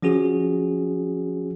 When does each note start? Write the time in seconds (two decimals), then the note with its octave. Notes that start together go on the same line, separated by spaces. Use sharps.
0.03 F3 C#4 F#4 G#4